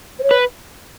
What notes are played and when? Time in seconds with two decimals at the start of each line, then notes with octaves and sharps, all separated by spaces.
0.19 C5
0.23 C#5
0.31 B4